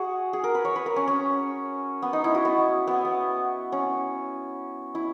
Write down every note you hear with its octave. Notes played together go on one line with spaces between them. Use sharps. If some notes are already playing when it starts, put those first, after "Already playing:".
Already playing: F#4 G#4
G#4
A#4
B4
C#5
B4
A#4
C#4
C#4
B3
D#4
E4
F#4
B3
B3
B3
C#4
E4